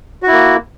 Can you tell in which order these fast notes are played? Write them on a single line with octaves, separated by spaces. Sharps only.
F#4 E4 A#3